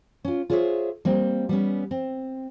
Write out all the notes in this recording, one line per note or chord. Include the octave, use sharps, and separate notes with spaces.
C#4 F4
F4 G#4 C5 C#5 D#5 E5
G3 A#3 C4
G3 B3 C#4
C4